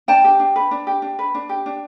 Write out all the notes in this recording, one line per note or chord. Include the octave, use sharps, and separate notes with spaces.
D4 G5 A5
G4
D4
B4
D4
G4
D4
B4
D4
G4
D4